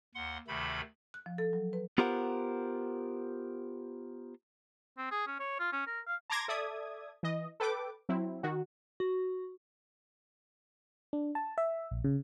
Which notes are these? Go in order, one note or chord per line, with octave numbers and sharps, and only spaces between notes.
D#2 F#5 C6
D2 C3 D#3 A3 B5
F#6
F3
A4
F#3
B4
B3 F4 G4 A#4 C5 F#5
C4
G#4
C#4
C#5
F4
C#4
A#4
F5
A5 A#5 C6 D6 G#6 A#6
A4 D5 E5 D#6 G#6
E3 D#5
A4 B4 G5 D6
F#3 C4 E4
D#3 F#4
F#4
D4
A5
E5
A#1
C#3